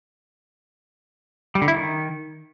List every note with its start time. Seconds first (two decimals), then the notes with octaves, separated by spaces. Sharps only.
1.55 G3
1.62 D3
1.68 E4
1.74 D#3